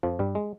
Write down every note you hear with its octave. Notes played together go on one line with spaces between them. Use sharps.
F2 F3
G2 G3
G#3